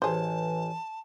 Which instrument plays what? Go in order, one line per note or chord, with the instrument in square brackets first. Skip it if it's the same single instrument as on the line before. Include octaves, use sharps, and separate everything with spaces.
[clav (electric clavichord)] A1 [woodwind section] E3 [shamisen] G#4 C5 [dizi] A5